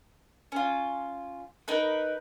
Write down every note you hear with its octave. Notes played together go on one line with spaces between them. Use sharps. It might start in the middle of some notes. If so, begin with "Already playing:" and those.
C#4 F4
D#4 A#4 B4